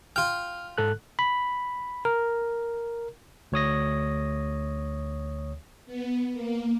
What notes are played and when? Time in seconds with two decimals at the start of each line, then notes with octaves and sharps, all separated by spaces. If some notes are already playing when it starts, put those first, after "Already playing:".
0.16 F4 G5 F6
0.78 G#2 A4 F#6
1.19 B5
2.05 A#4
3.52 D2 C#5 D#6 A#6
5.86 B3
6.33 A#3